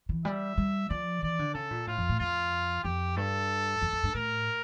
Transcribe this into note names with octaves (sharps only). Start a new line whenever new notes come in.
E3
G3 E5
G3
F3 D5
E3 D5
D3
C#3 A4
A#2
A2 F4
F2
A2
F2 F4
F2 G4
G2 A4
F2
F2
G2
A2 A#4